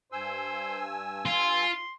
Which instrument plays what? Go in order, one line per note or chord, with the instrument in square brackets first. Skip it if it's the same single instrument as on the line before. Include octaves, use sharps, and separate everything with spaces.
[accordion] G2 G#5 E6 [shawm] C5
[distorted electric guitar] F4 [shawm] C6